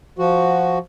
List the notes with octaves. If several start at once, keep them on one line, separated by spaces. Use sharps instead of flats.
F3 F#4